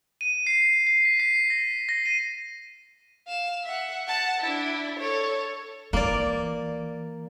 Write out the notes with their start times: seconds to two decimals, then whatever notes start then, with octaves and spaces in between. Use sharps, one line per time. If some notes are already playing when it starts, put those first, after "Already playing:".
0.21 D#7
0.47 C7
0.87 C7
1.05 B6
1.20 C7
1.50 A#6
1.89 A#6
2.06 D#7
3.27 F5 E7
3.63 E5 F#5
4.08 F#5 A5
4.41 D4 E4
4.99 A4 C#5
5.93 E3 A#3 D5